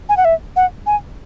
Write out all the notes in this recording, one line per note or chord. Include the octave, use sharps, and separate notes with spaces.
G#5
F#5
E5
F#5
G#5